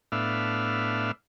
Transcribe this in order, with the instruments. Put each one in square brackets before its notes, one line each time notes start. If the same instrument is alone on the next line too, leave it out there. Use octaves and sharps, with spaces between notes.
[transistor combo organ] A2 B3 D4 E5 F5